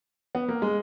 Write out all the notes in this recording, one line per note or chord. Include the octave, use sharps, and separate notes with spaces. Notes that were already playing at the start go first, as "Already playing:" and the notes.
B3
A#3
G#3